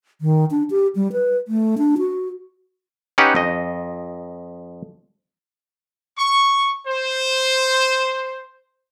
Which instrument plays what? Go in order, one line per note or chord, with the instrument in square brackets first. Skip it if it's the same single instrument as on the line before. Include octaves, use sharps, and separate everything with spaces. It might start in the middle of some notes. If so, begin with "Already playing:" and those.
[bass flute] D#3
D4
G4
G3
B4
A3
D4
F#4
[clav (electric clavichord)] C#4 D#4 G4 B4 F#5
F2 D#5
[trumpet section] C#6
C5